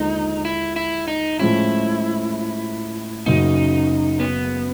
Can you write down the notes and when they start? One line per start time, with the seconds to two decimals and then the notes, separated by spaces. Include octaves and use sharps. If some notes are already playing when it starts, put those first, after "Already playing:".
Already playing: D#2 D3 F3 G#3 D#4
0.45 E4
0.76 E4
1.08 D#4
1.39 A2 F3 G#3 C#4 E4 F4
3.26 F#1 F#2 C#3 F#3 D#4
4.20 B3